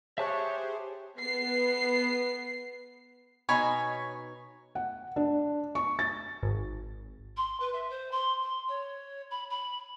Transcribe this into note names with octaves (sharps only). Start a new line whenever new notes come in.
G4 G#4 C5 C#5 E5 A5 F#6
B3 C7
B2 D#4 C#5 G#5 B5
F#5
D4
C#6
A6
G#1
C6
B4
E5
C5
C6
C6
C#5
B5
B5